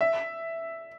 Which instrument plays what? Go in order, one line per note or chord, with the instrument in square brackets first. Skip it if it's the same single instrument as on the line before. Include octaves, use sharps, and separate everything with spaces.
[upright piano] E5